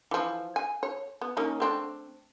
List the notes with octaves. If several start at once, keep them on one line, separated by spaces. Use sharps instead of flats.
E3 F3
G#5
C#5
B3
D#3 A#3 C#4
A3 C4 D4